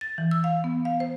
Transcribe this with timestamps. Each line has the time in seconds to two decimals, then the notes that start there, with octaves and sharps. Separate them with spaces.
0.01 A6
0.18 E3
0.31 E6
0.44 F5
0.64 B3
0.85 F5
1.00 C5